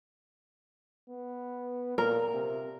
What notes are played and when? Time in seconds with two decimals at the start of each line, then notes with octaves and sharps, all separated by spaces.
1.09 B3
1.98 A#2 A#4
2.34 C3